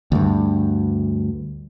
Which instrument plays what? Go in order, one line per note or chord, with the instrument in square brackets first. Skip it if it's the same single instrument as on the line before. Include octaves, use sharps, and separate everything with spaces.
[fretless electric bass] D2 G2